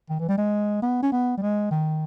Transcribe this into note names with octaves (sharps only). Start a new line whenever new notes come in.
D#3
E3
G3
G#3
B3
C#4
B3
G3
G#3
D#3